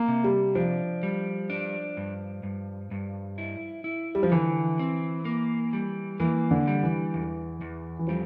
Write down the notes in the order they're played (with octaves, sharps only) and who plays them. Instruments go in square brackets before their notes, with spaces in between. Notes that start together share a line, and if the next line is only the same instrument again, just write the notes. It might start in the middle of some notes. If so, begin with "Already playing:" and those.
Already playing: [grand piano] A#3
[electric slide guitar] C3
[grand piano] G3
[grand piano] F3 [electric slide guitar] D4
[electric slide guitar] G3
D4
G2
G2
G2
E4
E4
[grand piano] G3
F3
[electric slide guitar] D3 [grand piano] E3
[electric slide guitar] C4
A#3
G3
[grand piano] E3 [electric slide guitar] A#3
[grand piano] D3
[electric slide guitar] G3
[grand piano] E3
[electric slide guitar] E2
E2
[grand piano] E3
[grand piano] F3 [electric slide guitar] G3